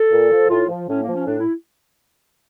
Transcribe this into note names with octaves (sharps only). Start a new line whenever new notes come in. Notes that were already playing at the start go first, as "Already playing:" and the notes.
Already playing: A4
A#2
F3
A2 F4
F3
A2 C#4
A#3
F3
C#4
A2 D4
E4